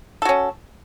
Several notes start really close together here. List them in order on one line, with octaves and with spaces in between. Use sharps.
A4 F#4 C#4